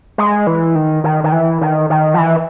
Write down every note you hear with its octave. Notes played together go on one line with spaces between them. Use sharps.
G#3
E3
D#3
D#3
D#3
E3
D#3
D#3
F3
E3